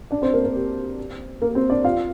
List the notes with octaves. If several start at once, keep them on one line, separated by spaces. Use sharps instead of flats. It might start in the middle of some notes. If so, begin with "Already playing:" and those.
D4 D5
C4 C5
A#3 A#4
A#3 A#4
G4
A#3 A#4
C4 C5
D4 D5
F4 F5